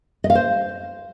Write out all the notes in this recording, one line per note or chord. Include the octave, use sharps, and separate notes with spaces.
D#5
F5
C5